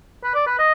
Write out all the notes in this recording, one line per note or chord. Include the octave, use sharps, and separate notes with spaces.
B4
D5
B4
D#5